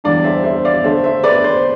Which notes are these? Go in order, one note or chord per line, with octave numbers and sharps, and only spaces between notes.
E2 D3 G3 D4 D5 F5
C5 E5
C5 E5
D5 F5
D3 A3 D4 C5 E5
C5 E5
B4 D5
C5